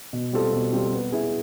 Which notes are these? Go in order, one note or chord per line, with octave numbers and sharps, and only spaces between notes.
B2
G3 C4 F4 A4
B2
G3 C4 F4 A4
B3
E4 G#4